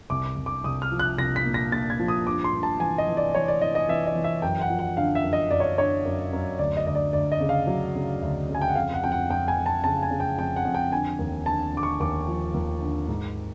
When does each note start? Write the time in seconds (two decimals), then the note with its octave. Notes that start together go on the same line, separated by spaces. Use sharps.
0.10 C2 D6
0.36 C2
0.46 D6
0.64 C2 D#6
0.82 F6
0.92 F3
0.99 F#6
1.18 C2 A#6
1.36 B6
1.45 A#2
1.54 A#6
1.72 A#2 A6
1.90 G#6
1.99 F3
2.08 D#6
2.26 G2 D6
2.44 C6
2.53 G2
2.63 A5
2.80 E3 G#5
2.98 D#5
3.08 E3
3.17 D5
3.35 E3 C#5
3.48 D5
3.61 E3 D#5
3.75 D#5
3.89 E3 E5
4.07 D#5
4.15 E3
4.24 E5
4.42 F#2 G5
4.61 F#5
4.70 F3
4.79 F#5
4.97 D3 F5
5.15 E5
5.24 F#2
5.33 D#5
5.51 F#2 D5
5.60 C#5
5.78 D3 C#5
6.05 F#2
6.33 F#2
6.59 D2 D5
6.77 D#5
6.87 D2 D#5
6.95 D5
7.13 D2 D5
7.32 D#5
7.40 C#3
7.49 F5
7.67 F#3
7.95 C#3
8.22 D2
8.49 C#3
8.55 G#5
8.61 G5
8.68 F#5
8.76 F2 F5
8.94 F#5
9.03 F2 G5
9.12 F#5
9.30 F2 G5
9.48 G#5
9.56 F2
9.66 A5
9.84 C#3 A5
10.03 G#5
10.11 C#3
10.20 G5
10.38 F2 G5
10.56 F#5
10.65 F2
10.74 G5
10.92 D3 G#5
11.19 D#2
11.46 D3 A5
11.73 D3 D6
11.83 C#6
12.00 D#2 D6
12.28 F3
12.54 D#2
12.82 D3
13.08 G#2